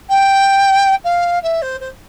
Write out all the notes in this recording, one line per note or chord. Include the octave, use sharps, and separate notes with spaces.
G5
F5
E5
C5
C5